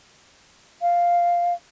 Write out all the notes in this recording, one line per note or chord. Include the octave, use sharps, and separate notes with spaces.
F5